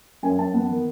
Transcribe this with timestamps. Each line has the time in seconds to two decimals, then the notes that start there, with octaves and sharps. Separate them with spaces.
0.23 F#2 G#5
0.38 F#2 A5
0.54 B3
0.69 D#3